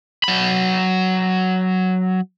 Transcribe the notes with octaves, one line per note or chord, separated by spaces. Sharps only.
F#3 B5